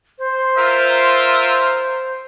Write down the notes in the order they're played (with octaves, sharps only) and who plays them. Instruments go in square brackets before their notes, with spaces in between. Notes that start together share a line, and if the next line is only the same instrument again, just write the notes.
[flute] C5
[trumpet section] F4 A#4 E5